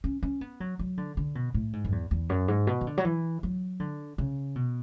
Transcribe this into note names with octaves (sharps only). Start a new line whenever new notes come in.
C#4
C#4
B3
F#3
F#3
D3
D3
B2
A2
G#2
F#2
E2
E2
F#2
G#2
B2
E3
D3
F#3
E3
F#3
D3
C#3
B2